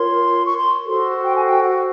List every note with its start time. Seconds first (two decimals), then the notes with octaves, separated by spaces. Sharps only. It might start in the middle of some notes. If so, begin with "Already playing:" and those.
Already playing: F4 A#4 C#5 C6
0.44 C#6
0.57 C6
0.84 F#4 A4 C5 C6
1.24 G5
1.35 G#5
1.45 G5
1.64 F#5